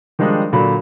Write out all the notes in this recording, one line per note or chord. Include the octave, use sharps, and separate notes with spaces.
D#3 F3 G3 G#3 D4 D#4
A#2 D3 F#3 B5